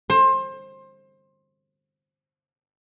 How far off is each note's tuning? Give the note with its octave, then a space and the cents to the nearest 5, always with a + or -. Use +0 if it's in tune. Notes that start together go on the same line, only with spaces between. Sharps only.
C5 +25